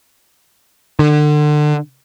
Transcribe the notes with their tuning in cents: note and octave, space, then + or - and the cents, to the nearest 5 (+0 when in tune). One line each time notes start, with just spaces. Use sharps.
D3 +30